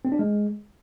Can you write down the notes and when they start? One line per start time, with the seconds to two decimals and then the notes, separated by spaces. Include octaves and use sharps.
0.05 C4
0.12 D4
0.19 G#3